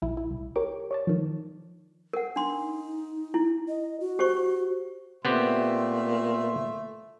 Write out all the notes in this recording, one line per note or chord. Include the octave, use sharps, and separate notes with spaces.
A#1 E4
E4
C2
G4 A#4 C#5 D6
C#5 D5 A5
D#3 F3
A#4 F#5
D4 D#4 C6
E4
D#5
F#4
G4 C5 C#6
A#2 A3 B3 C4 G4 E5 C6